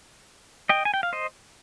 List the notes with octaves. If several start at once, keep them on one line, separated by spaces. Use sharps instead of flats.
D#5 G5
G#5
G5
F5
C5 D#5